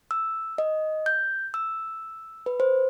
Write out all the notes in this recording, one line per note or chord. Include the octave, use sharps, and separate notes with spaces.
E6
D#5
G6
E6
B4
C5